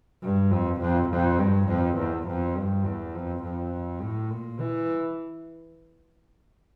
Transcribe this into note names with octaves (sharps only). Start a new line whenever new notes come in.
G2
F2
F2
F2
G2
F2
E2
F2
G2
E2
F2
F2
A2
A#2
E3